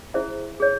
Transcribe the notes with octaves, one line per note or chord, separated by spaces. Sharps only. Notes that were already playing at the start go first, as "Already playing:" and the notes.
E4 G#4 C5 E5
G#4 C#5